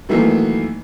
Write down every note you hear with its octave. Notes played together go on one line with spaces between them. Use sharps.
D#3 E3 F#3 A3 A#3